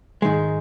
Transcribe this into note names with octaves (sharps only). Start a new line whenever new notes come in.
G#2 D#3 G#3